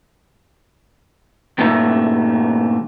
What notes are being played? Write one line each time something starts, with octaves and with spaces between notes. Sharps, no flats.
G2 A#2 D#3 A3